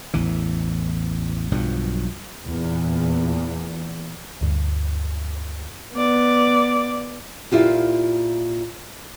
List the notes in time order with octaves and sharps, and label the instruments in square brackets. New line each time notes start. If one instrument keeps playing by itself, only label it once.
[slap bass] A1 E2 E3
B1 G2 F3 F#3
[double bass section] E2 A#2
[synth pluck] D2 G2
[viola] B3 D5
[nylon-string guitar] A#2 E4 F4 G4